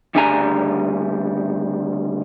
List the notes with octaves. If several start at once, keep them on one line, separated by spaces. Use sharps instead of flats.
D2 G2 C#3 G3 G#5 A#5